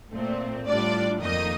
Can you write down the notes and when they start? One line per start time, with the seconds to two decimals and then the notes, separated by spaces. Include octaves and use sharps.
0.12 A#2 A3 C4
0.67 A2 G3 D4 F4 D5
1.21 F2 D#3 A#3 D#4 D#5